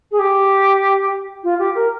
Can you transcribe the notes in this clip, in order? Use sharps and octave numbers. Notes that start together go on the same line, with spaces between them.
G#4
G4
F4
G4
A#4